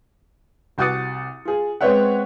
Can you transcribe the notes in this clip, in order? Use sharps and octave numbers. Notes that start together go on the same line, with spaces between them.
C2 F#4 D6 D#6 A6 C#7
F4 G#4
G#3 B3 C4 C#5 E5 F#5